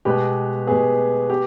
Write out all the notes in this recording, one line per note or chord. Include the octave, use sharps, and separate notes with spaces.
B2 G#3 B3 G4 B4
B2 G#3 B3 G#4
B3 G4